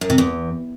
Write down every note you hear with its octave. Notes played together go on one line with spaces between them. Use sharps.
F#2
C3
E2